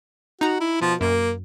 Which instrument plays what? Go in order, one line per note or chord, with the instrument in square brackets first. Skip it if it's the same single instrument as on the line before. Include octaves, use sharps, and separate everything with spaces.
[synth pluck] D#4 A#5 [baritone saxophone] F#4
[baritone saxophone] E4
[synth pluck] B2 [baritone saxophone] F3
[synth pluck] F#2 [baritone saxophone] A#3